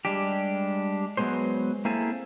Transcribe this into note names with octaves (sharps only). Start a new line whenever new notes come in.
G3 G#3 D4 G4
F#3 G#3 B3 G#4 C5
A#3 C4 E4 G#4 A4